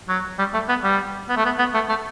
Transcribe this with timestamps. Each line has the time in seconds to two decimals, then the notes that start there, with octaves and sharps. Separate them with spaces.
0.08 F#3
0.38 G3
0.53 A3
0.69 B3
0.84 G3
1.29 B3
1.37 A3
1.45 B3
1.59 B3
1.74 A3
1.89 A3